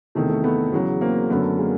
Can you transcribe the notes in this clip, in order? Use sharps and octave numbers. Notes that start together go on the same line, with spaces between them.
E2 C3 D#3 A3
A3
A3 B3
E2 C#3 F#3
A#3 C4
F#2 D3 F#3 A3 B3
G#3 A#3